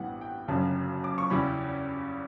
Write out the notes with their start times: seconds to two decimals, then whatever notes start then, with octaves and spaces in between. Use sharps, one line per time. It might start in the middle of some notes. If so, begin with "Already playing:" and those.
Already playing: A1 G2 E3 G3 B3 F#5
0.21 G5
0.48 G1 F#2 C#3 A5
1.04 D6
1.18 C#6
1.30 E2 C#3 G3 C#4 E4 B5